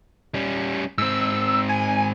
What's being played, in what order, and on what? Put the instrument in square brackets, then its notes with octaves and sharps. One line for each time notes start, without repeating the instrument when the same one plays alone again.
[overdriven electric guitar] G3 C#4
[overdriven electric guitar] G#2 C4 [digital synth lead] E6
[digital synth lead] G#5